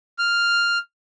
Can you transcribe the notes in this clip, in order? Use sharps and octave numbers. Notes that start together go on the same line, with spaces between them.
F6